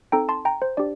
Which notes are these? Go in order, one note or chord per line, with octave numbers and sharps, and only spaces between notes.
C4 D#4 A4 G5 A#5
A5 C6
G5 A#5
C5
D4 G4 D5